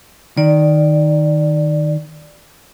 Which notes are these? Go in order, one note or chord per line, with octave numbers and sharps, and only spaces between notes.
D#3 D5